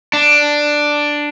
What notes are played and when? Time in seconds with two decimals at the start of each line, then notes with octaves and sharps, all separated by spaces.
0.13 D4